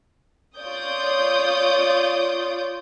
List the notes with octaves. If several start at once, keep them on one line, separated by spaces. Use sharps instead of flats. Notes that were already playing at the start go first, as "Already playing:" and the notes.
F4 C#5 D5 D#6 G6